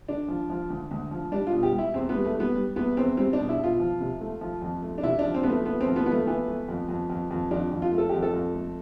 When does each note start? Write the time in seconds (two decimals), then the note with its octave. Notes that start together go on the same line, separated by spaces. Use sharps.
0.08 D3 D4
0.28 F3
0.50 F3
0.70 D2
0.91 D2
1.11 F3
1.32 G3 D4
1.47 F4
1.53 B2
1.63 G4
1.73 G3
1.78 E4
1.94 E2 C4
2.09 B3
2.14 G3
2.25 A3
2.35 G3 B3
2.55 G3
2.76 E2 B3
2.97 E2 C4
3.17 G3 C4
3.33 D4
3.39 B2
3.49 E4
3.59 B2 F4
3.80 F3
4.00 C3
4.21 A3
4.41 F3
4.62 F2
4.82 A3
4.98 D4
5.03 C3 E4
5.19 D4
5.24 F3
5.34 C4
5.43 F3 B3
5.50 A3
5.65 A3 B3
5.81 C4
5.86 F3
5.96 B3
6.06 F3 B3
6.12 A3
6.27 E3 B3
6.48 A3
6.69 F2
6.89 F2
7.10 F2
7.31 F2
7.51 F2 D4
7.72 F2
7.82 F4
7.92 A3
7.98 A4
8.09 F2 G4
8.22 A4
8.34 F2
8.55 A3